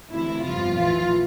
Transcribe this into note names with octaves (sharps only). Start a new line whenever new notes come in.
D2 C3 E3 E4
G1 F2 C3 F3 F4
A#1 A2 E3 F4